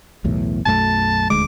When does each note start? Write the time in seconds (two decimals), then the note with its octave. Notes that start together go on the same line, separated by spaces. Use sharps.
0.24 B1 E2 A2
0.66 B1 F#2 A3 A5
1.30 D#1 D2 G#3 D6